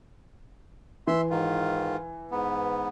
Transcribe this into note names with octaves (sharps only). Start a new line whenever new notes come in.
E3 E5 C6
G#2 D#3 F4
G#2 B3